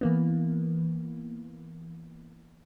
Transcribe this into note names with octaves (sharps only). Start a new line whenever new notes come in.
E3 A#3 B3